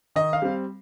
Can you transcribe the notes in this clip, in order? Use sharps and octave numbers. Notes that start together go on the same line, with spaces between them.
D#3 D#5
F5
G3 C4